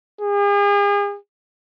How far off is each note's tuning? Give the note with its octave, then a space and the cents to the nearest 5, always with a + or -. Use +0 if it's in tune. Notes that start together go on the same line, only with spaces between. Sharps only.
G#4 -40